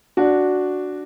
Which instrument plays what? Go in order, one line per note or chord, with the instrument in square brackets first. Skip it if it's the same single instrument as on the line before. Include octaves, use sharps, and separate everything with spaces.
[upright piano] D4 F#4